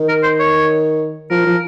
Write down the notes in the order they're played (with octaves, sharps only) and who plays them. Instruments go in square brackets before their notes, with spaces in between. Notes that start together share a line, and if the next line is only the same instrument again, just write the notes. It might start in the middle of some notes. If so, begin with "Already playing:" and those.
Already playing: [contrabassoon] D#3
[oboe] A#4
C5
C#5
[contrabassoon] F3 [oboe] A#4
[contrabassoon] F3